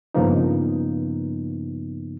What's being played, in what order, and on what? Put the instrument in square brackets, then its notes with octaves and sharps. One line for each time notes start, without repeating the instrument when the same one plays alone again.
[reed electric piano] G2 C#3 F3 A#3 B3 D#4